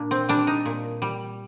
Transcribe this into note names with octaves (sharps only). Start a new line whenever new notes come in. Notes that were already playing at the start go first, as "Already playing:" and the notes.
Already playing: A#2 D4
C4
G3 D4
D#4
A#2
G3